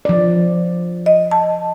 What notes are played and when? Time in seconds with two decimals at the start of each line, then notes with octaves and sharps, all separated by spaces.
0.05 F3 D5
1.06 D#5
1.31 A5